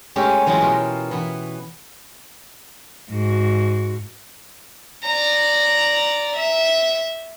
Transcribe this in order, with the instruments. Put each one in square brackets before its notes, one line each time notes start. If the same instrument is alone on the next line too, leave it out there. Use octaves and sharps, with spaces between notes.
[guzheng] G#3 A3 C#4 G4 A4
E3 F#3 G#3 E4 F4 G#4
B2 A#4 G5
E3 B3
[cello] G#2 F#4
[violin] D5 A#5
E5